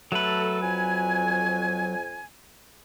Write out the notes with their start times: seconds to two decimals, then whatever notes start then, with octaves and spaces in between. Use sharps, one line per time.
0.12 F#3 A3 A4 B4
0.61 F2 G#5